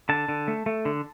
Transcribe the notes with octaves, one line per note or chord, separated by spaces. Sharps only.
D3 A5
D3
A3
A3
D3